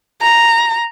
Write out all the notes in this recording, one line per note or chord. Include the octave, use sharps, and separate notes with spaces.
A#5